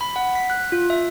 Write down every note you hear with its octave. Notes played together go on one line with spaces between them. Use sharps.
B5
F#5
B6
F#6
F4
E5